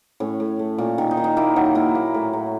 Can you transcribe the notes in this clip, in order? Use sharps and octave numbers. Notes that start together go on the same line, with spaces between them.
A2 C#4
A2
A3
A#2
D#3
D#4
D#3
D#4
A#3 E4
F#3 D#4
A#3 E4
A#3
A2
A2